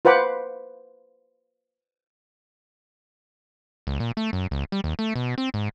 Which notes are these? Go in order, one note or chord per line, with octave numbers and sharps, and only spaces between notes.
F4 B4 C5 F#5 B5 D6
C#2
A#2
A3
F#2
C#2
G3
D#2
A3
B2
C4
G#2